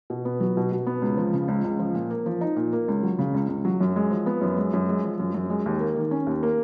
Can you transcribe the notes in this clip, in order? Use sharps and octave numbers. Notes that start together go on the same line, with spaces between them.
B2
B3
F#3
B2
B2
B3
C#2
F3
C#3
C#2
C#2
F3
A#2
A#3
F3
D#4
A#2
A#3
C#2
F#3
C#3
C#2
C#2
F#3
F#2
G#3
F3
B3
F#2
G#3
F#2
G#3
F3
F#2
F#2
G#3
D#2
A#3
D#3
C#4
D#2
A#3